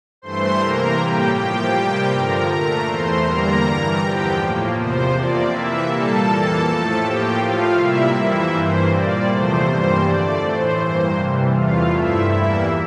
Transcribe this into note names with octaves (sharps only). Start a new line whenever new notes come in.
G2 E3 A3 C5 C6
C3 E3 A#3 A#4 A#5
A2 G3 A#3 G4 G5
A2 F3 A#3 G4 G5
C3 G3 A#3
G2 D3 F3 A#4 A#5
A#2 A3 A#4 A#5
E2 E3 A3 C5 C6
E2 D3 G3 A#3 A#4 A#5
G2 E3 G3
E2 D3 F3 G4 G5
A2 F3 A#3
E2 C3 F3 C5
F2 C3 F3 A#3 D5
C3 E3 A#3 E4 E5
A#2 G3 A#3 A4 A5
F2 E3 A#3
A2 F3 A3
A2 F3 A#3 G4 G5
A2 F3 A3 F4 F5
C3 G3 A#3 E4 E5
F2 E3 G3 A#3 E4 E5
G2 E3 A#3 C5
A#2 G3 A#3 D5
E2 C3 F3 A3 C5
G2 E3 G3 A#3
F2 D3 A3 D5
A2 E3 A3 C5
G2 E3 A#3
C3 E3 G3
E2 C3 E3 A3 F4 F5
G2 F3 A3 E4 E5
E2 E3 G3 A#3 E4 E5